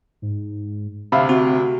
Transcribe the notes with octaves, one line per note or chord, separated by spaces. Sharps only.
G#2
D2 C3 E5 F5 B5
C4 F#4